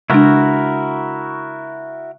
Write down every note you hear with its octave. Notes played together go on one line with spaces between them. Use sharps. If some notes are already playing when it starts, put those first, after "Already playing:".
C#3 G#3 D4 E4 F#4 A#4